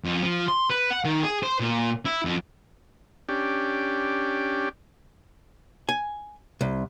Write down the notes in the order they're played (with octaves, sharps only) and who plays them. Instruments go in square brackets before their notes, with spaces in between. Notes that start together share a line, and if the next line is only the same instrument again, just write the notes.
[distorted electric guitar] F2
F3
C6
B4
F#5
D#3
G#4
C5
A#2
E4
F2
[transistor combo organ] C#4 D4 G4
[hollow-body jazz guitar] G#5
C2